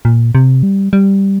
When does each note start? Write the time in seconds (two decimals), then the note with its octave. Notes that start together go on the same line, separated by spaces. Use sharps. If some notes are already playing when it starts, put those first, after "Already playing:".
0.05 A#2
0.35 C3
0.63 G3
0.93 G3